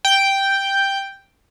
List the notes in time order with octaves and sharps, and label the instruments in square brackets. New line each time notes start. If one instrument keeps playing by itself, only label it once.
[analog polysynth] G5